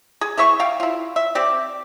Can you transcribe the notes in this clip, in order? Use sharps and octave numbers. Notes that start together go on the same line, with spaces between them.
G#4
E3 G#4 E5 C#6
G3 F5 G5
E4 F4
E5
C4 G4 D5